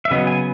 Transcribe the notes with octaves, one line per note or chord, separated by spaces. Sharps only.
E5
C#3 F#3 B3 D#5
G#5